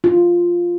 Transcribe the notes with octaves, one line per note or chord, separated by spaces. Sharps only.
F4